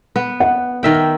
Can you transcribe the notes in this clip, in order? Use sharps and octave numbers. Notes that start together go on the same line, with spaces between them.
B3
F#5
D#3 E5 G5